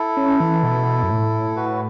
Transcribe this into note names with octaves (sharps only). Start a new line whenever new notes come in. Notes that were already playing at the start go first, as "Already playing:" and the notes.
Already playing: E4 A4
C#4
E3
B2
F#2
A2
F#4 B4